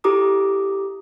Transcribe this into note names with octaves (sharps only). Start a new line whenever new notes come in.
E4 G4 A4 A#5 D6 D#6